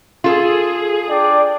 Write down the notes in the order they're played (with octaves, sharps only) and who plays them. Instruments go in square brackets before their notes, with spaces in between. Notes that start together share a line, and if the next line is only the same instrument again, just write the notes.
[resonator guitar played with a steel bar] F4 A4 [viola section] G#4
[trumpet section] D4 D5 G5